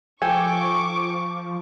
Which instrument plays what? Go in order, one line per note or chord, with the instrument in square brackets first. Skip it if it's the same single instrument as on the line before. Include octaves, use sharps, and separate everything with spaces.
[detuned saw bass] F3 [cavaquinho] A4 G5 [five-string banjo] G#5 [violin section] C#6 D6